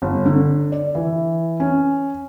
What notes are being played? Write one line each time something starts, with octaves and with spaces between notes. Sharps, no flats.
G1
D3
D5
E3
C#4